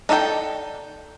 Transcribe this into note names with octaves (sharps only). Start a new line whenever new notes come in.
D#4 A4 D5 D#5 G5